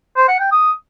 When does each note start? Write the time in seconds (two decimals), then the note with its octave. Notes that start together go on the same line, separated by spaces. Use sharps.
0.17 C5
0.28 F#5
0.40 G5
0.51 D#6